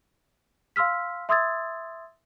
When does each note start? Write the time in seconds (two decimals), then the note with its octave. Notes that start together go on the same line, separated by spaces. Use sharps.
0.76 F5 C6 E6 F6 B6
1.29 E5 C6 D#6 E6 G#6 A6